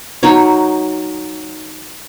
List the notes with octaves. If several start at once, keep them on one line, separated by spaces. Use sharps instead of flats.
F#3 D#4 C#5